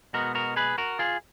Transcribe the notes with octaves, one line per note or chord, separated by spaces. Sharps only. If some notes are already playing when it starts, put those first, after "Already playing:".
B2 G#3 B3 F#4 A#4
F#4 A#4
G#4 B4
F#4 A#4
F4 G#4